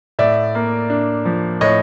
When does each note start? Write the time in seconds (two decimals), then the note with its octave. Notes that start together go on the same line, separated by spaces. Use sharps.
0.19 A2 D5 E5
0.55 A#3
0.90 D4
1.25 F3
1.61 A2 C#5 D#5